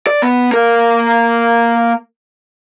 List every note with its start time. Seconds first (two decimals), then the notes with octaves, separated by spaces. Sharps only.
0.07 D5
0.22 B3
0.52 A#3 A#4